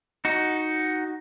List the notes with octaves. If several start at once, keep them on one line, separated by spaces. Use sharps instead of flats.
D#4 F#4